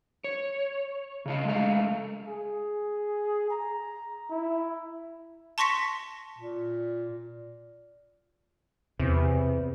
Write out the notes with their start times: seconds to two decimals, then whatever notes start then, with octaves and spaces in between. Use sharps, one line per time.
0.24 C#5
1.26 C#3 D#5 F5
1.45 G#3 A3 D#5 F5
2.28 G#4
3.50 A#5
4.30 E4
5.58 A5 C6 C#6 A#6 B6 C#7
6.38 A#2
8.99 E2 C3